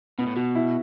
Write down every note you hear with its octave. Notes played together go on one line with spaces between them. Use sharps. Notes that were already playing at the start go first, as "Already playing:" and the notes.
B2 B3
A2
B2 F#4
E4